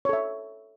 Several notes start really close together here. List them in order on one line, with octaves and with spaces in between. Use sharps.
C#5 A4 E5